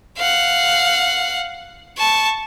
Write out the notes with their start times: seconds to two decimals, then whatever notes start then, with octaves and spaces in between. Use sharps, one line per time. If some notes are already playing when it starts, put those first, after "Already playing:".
0.17 F5 F#5
1.98 A5 C#6